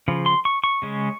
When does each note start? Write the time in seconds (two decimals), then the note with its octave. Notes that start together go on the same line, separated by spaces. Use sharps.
0.08 C#3 F3
0.26 C6
0.45 C#6
0.64 C#6
0.82 C#3 G#3 C#4